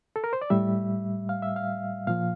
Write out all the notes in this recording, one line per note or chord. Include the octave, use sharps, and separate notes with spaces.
A4
A#4
C5
D5
A2 G3 E5
F5
E5
F5
A#2 F3 F5